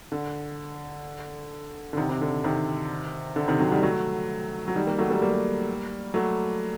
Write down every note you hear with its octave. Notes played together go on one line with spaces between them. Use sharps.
D3
D3
C3 D#3
C3 D#3
D3
C3 D#3
D3
C3 D#3
D3 F#3
D#3 G3
F#3 A3
F#3
D#3 G3
G3 A#3
F#3 A3
G3 A#3
G3 A#3
F#3 A3